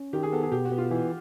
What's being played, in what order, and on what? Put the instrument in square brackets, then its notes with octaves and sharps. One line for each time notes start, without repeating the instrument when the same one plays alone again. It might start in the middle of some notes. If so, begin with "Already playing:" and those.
Already playing: [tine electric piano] C#4
[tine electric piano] D#3 [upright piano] G4
[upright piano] G#4
[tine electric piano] B3 [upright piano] A4
[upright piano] G#4
[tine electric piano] B2 [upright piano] G4
[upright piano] F#4
[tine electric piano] B3
[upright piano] F4
[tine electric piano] E3